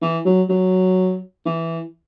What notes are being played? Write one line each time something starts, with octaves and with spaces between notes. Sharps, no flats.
E3
F#3
F#3
E3